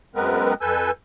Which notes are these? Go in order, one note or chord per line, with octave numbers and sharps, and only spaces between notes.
F#2 G#3 B3 C4 A#4 B4
F2 A4 B4 G#5 E6 G6